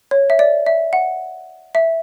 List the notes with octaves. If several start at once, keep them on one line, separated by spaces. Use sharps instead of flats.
C#5
E5
D5
E5
F#5
E5